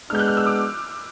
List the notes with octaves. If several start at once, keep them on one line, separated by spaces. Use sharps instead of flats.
G#3 B3 D4 F6 G6
F#6
F6
E6
D6